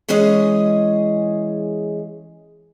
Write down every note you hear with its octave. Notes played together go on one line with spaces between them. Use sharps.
E3 G#3 C#4 G#4 D#5